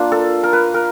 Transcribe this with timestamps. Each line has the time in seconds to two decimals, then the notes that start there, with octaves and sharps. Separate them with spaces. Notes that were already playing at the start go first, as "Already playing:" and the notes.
Already playing: A#3 D4 F4
0.12 A4
0.43 A#4
0.53 B4
0.74 A#4